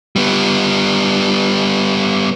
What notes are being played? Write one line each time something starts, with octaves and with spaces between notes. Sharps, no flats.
G3 B3